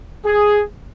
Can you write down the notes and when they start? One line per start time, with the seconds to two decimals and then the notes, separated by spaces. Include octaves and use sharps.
0.25 G#4